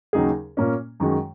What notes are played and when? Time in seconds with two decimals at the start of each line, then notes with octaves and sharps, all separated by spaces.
0.13 D#2 C#3 F#3 D#4 G#4
0.57 A#2 A#3 C#4
1.00 F#2 D#3 G#3 F#4